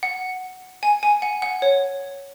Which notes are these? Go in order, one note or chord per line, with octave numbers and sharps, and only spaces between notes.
F#5
G#5
G#5
F#5
F#5
C#5